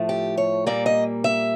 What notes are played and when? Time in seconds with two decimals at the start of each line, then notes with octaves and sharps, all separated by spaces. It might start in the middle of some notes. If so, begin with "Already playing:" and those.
Already playing: A2 F3 A3
0.09 G4
0.37 C#5
0.66 A#2 G3 A#3 D5
0.86 D#5
1.24 E5